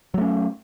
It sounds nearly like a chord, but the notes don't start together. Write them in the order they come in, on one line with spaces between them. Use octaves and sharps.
F#3 A3 C#4